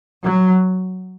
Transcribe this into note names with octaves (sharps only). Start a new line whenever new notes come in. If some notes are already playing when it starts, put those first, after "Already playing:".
F#3